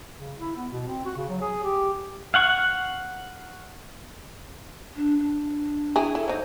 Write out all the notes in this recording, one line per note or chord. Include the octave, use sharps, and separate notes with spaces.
C#3
E4
B3
B2
C4
F#4
C#3
F#3
G#4
G4
F5 F#5 C#6
D4
D4
E4 G4 G#4
E4 A4
F#3 D#4 C5